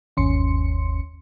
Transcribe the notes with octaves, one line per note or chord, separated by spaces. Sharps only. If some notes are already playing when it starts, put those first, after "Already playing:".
G1 D#2 C#4 C6 C#7